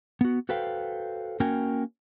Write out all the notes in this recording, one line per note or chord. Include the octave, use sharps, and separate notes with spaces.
B3 F#4
F#4 A4 B4 C5 F5 G5
A#3 C#4 F#4 A#4 G5 G#5